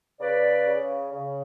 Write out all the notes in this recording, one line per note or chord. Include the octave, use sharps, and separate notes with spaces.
C#3 B4 D5
C#3
C#3